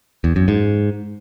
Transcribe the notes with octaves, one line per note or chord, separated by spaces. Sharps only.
E2
F#2
G#2